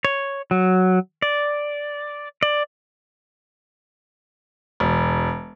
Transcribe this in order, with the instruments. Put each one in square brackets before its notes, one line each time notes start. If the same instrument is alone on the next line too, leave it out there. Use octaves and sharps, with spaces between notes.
[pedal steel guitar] C#5
F#3
D5
D5
[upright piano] E1